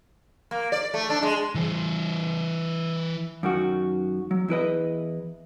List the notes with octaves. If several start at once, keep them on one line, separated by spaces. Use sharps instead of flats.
A#3
D5
A3
D4
G#3
E3 C5
F#2 D#3 F#4
F#3
E2 E4 B4 D#5